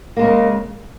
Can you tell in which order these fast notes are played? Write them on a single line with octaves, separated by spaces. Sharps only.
A#3 G#3 C#3